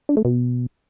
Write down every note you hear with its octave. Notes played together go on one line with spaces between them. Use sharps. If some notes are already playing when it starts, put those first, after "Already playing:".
D4
A3
B2